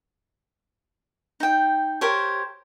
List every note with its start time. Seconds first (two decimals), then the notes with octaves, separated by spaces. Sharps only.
1.40 D#4 G5
2.01 G4 A#4 C5 C#5